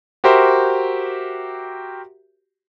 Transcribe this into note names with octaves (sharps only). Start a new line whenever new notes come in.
F#4 G4 A#4 C5 E5